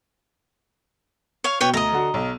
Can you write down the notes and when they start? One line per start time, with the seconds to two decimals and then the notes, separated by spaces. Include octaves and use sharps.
1.44 C#5 F5
1.60 B2 B4 C#5 G5
1.74 D2 D#5 A#5
1.92 D3 F#4
2.14 B1